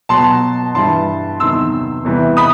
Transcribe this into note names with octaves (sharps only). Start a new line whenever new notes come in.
B2 F#3 A5 C6
G2 E3 G3 A5 C6
E2 C3 D#3 F#3 C6 E6
E2 C3 E3 G3
B5 D#6